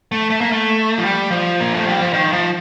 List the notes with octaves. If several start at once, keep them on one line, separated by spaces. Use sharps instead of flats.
A3
A3
A#3
A3
F3
G3
F3
A#3
A3
G3
F3
D#3
F3